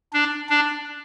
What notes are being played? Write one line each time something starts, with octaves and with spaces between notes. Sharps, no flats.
D4
D4